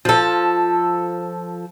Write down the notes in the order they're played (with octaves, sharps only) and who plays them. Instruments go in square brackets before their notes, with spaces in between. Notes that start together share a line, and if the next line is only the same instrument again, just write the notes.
[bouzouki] F3 A4